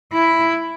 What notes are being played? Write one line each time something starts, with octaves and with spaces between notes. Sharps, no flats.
E4